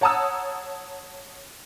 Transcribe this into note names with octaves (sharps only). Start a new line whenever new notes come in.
C#5 F#5 A5 A#5 D#6 E6